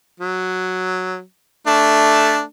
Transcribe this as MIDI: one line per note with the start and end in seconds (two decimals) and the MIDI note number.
0.20 1.21 54
1.67 2.42 57
1.67 2.42 62